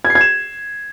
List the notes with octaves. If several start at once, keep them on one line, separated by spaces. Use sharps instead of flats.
G#6
C7
G#6
E7